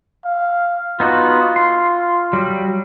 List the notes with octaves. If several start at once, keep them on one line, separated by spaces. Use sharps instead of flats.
F5
B3 D#4 F4 F#4
C6
F#3 G3